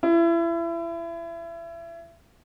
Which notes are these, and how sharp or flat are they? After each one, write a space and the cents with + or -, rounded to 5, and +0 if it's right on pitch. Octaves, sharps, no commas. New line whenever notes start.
E4 +30